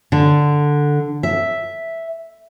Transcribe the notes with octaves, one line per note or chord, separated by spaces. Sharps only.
D3
E5